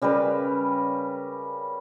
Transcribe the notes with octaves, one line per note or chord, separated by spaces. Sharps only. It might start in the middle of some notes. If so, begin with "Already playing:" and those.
C#3 G3 A#4 B4